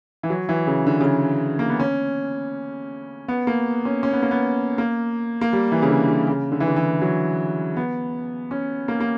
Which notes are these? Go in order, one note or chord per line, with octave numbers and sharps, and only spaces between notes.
E3
F#3
E3
C#3
D3
C#3
D3
A#3
B3
C#4
B3
A#3
C#4
C#4
B3
A#3
B3
A#3
A#3
G3
E3
C#3
D3
D3
C#3
D3
E3
D3
E3
F#3
B3
C#4
A#3
A#3